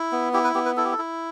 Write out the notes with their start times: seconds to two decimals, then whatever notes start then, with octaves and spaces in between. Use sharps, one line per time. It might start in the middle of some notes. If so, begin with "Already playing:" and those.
Already playing: E4
0.12 B3
0.33 E4 G4
0.44 B4
0.55 B3 G4
0.66 B4
0.77 E4 A4
0.85 G4
0.92 A4
0.99 E4